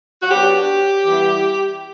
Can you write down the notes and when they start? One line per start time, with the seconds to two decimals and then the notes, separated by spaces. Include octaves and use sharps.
0.22 F#4
0.30 F#3 B3 D4 G4
1.06 E3 G3 B3 E4